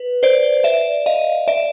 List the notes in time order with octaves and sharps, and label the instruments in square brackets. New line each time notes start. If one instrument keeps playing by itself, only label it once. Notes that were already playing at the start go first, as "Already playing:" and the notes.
Already playing: [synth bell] B4
C5 D5
D5 E5
D#5 F5
D5 E5